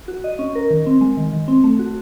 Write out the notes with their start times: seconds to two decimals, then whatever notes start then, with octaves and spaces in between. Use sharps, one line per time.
0.08 F#4
0.24 D#5
0.39 C#4
0.55 A#4
0.71 D#3
0.86 C4
1.01 G#3
1.17 D#3
1.33 D#3
1.48 C4
1.64 A3
1.79 F#4